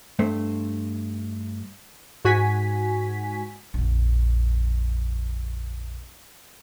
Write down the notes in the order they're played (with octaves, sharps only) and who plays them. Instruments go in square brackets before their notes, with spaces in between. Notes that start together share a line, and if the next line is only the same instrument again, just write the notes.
[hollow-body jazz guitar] G2 A3 C5
[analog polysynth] G#2 F#4 G#5 B6
[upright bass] A#1 F2